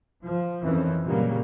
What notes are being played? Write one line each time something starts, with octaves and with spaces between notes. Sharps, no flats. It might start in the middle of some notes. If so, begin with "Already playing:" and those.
F3
F2 D#3 E3 C4 C#4
A#2 C#3 F#3 G3 A#3